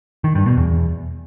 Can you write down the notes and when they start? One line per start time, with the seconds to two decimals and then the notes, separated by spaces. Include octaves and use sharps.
0.24 D#3
0.35 G2
0.46 B2
0.57 E2